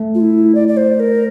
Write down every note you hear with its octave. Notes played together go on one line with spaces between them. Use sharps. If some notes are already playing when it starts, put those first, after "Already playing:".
Already playing: A3
F4
E4
D5
D5
C5
A#4